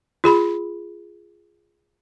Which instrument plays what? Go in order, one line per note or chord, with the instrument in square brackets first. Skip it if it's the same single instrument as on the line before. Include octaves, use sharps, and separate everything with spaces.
[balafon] F4 G#4 B5